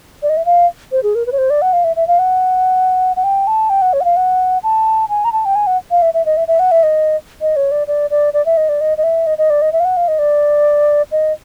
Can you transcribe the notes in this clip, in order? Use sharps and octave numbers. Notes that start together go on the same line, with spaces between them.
D5
D#5
E5
F5
C5
G#4
A#4
B4
C#5
C5
D5
F#5
F5
E5
E5
F5
F#5
F#5
G5
A5
G5
F#5
C#5
F#5
F5
F#5
A5
G#5
A#5
A5
G5
G#5
F#5
F5
E5
E5
D#5
E5
E5
F#5
E5
D#5
D#5
C#5
D5
D5
D5
D5
E5
D#5
D5
D#5
D#5
E5
D#5
D#5
D5
D#5
E5
F5
F#5
F5
D#5
D5
D#5